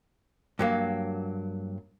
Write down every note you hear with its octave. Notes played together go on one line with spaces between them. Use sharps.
G2 F#3 A#3